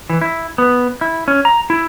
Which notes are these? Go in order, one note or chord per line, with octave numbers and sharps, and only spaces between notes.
E3
E4
B3
E4
C#4
A#5
E4